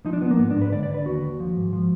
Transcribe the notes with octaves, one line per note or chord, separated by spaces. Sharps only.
F3 D#4
D4
F3 B3
A#3
G#2 B3
D4
G#2
B4
D3 D5
D5
D3
B4
D#2 F#4
D#2
F3
G#2
F3